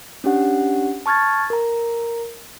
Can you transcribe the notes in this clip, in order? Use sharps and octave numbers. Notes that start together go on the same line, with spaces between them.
C#4 D4 G4 F#5
A5 C#6 F6 G#6 A6
A#4 A#5